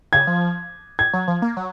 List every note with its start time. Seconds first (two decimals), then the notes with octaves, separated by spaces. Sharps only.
0.13 C#3 G#6
0.27 F3
0.99 G#6
1.13 F#3
1.28 F3
1.42 A#3
1.57 F#3